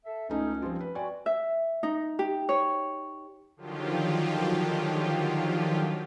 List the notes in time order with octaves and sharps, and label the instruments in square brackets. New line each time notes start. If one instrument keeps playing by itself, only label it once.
[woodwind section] A4 E5
[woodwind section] C#2 C#4 [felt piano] A3 D#4
[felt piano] F3 G3 C4
B4
[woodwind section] C4 F#4 [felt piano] D5 G#5
[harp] E5
D#4
G4
C#5
[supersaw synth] D3 D#3 F3 F#3 F4 G4